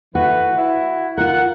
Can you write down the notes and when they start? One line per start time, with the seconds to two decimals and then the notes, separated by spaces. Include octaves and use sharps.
0.15 E3 A3 F#4 B4
0.58 E4
1.18 F4 A#4 F#5